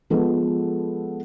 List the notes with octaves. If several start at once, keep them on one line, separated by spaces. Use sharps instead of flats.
F3 G#3 B3 A4